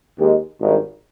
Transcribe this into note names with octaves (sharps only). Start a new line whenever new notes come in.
D#2 D#3 G#3 D#4 G4
G#1 G2 D#3